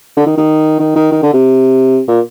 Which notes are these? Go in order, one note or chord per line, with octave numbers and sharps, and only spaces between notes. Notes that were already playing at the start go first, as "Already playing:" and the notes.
D3
D#3
D#3
D#3
D#3
D#3
D3
C3
A#2